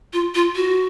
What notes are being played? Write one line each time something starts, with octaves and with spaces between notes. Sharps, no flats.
F4
F4
F#4